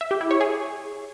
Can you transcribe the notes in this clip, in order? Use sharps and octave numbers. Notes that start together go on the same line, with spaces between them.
E5
G4
E4
C#5
G#4